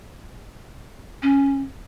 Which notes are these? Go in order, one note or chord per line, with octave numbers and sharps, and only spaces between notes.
C#4